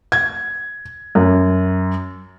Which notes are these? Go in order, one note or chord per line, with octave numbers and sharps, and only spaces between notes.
G#6
F#2